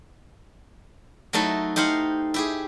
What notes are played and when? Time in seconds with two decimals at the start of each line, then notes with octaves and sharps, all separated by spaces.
1.33 F#3 A3 D#4 E4 A4
1.76 D#4 G4 C5 F5 F#5
2.34 E4 G4 G#4